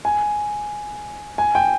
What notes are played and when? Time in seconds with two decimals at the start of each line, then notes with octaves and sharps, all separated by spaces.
0.05 G#5
1.38 G#5
1.55 G5